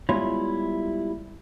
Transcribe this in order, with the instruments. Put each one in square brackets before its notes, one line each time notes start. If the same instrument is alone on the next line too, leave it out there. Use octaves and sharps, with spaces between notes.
[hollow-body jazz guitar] G3 G#3 B3 E4 F4 C#5